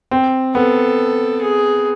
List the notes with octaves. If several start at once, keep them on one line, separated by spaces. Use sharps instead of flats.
C4
B3 A4
G#4